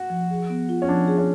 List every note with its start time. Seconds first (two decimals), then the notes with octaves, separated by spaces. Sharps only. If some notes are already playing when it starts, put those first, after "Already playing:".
Already playing: F#4
0.10 F3
0.31 G#4
0.50 B3
0.69 F4
0.82 C#4
0.88 F3 D4
1.08 G#4
1.18 C#4